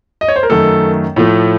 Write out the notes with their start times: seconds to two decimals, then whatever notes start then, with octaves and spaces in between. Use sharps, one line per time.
0.21 D#5
0.28 C#5
0.36 C5
0.43 A#4
0.50 F#2 D#3 A3 A4
1.16 A2 F3 A3